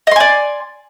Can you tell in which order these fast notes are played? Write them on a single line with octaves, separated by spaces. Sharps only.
D#5 C6 G#5 D5